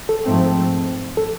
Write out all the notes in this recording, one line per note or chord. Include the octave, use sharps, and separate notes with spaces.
A4
G#2 F3 A3 C4
A4